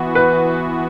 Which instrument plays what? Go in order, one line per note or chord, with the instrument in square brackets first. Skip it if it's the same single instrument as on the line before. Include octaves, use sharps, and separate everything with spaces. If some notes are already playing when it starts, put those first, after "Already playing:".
Already playing: [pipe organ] E3 B3 F#4
[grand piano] B4